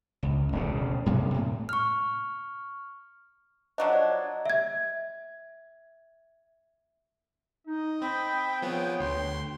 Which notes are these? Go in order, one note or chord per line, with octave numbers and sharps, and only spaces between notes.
C#2
E1 D2 C#3
F#2 C3 G#3 A#3
A2
C#6 F6
F3 F#3 D4 D#5
D5
E5 G#6
D#4 D#5
C4 G5 B5
F3 B3 G#4 C#5
D2 C6